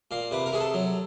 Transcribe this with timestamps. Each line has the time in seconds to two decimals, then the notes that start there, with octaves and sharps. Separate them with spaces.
0.11 A#2 F5
0.31 C3 B4
0.46 A#4
0.52 C3 G#4
0.61 A4
0.74 F#3